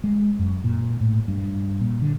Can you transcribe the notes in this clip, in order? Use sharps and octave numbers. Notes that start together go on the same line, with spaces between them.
G#3
F#2
A#2
A2
G2
A#2
D3